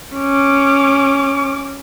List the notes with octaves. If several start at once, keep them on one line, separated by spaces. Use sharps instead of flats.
C#4 D6